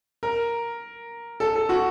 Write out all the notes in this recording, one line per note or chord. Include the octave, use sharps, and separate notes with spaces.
A#4
A4
A4
F#4